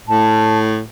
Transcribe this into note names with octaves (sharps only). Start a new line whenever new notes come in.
A2 A5